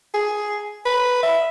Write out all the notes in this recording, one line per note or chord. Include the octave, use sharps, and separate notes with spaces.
G#4
B4
E5